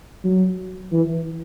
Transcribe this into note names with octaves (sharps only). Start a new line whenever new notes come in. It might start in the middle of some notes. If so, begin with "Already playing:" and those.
F#3
E3